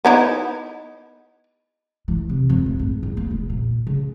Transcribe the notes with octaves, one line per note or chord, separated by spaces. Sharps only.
B3 D#4 E4
E3
C3
F2
A3
G#1
E2
A#3
E1
A#2
C#3